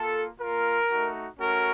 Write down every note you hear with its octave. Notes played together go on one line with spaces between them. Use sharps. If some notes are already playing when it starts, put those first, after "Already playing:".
Already playing: A#3 F4 A4
A#3 F4 A#4
A3 D#4 F#4
A3 C#4 F#4 A#4